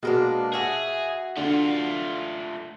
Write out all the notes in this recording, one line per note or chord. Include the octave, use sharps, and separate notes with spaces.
B2 G#3 A#3 D4
F#4 G#4 E5
D3 A3 F4